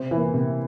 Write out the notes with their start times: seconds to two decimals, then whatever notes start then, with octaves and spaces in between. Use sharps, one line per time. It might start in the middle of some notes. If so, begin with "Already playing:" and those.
Already playing: C3 C5
0.11 E3 A#3
0.34 C3